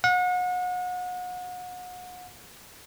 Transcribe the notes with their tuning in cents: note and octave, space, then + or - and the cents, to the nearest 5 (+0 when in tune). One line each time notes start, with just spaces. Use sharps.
F#5 -35